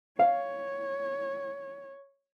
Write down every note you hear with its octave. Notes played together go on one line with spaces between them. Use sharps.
C#5 F5